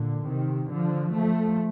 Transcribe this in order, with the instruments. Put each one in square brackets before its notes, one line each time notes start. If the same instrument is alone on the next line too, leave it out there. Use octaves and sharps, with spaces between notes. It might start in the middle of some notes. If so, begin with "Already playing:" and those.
Already playing: [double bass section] A#2 D3
C3 D#3
D3 F3
F3 A3